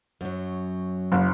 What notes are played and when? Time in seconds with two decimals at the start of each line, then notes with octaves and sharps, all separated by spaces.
0.21 F#2 F#3
1.12 F#1